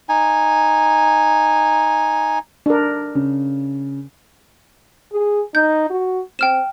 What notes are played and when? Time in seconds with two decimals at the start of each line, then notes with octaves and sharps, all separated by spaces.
0.09 D#4 G#5
2.66 D4 A#4
3.15 C#3
5.12 G#4
5.55 D#4 G6
5.90 F#4
6.39 C4 G5 F6 E7